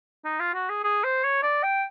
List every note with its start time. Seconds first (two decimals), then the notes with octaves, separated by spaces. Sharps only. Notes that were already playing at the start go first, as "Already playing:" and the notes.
0.25 D#4
0.40 F4
0.54 F#4
0.70 G#4
0.84 G#4
1.04 C5
1.24 C#5
1.43 D5
1.63 G5